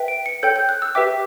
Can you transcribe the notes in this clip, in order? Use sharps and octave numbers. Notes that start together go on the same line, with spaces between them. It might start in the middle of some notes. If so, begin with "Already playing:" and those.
Already playing: B4 E5 G5
D7
C#7
A4 C#5 G5 G6
G6
F#6
E6
G4 B4 E5 G5 D6